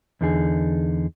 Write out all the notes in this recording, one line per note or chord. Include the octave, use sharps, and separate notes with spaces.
E2 D3 D#4 G#4